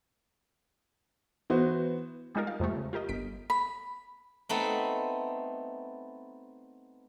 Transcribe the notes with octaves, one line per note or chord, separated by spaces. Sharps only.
E3 B3 F#4 C5
G3 G#3 D#4 F4 A#4
F5
F2 C3 G#3 A3
C#3
F4 G4 A#4 D#5
G1 B6 D7
B5
A3 B3 C4 D#4